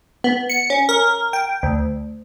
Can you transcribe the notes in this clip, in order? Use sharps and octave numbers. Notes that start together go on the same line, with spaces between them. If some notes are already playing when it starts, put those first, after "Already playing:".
B3
C#7
C#4
A#4
G5
D2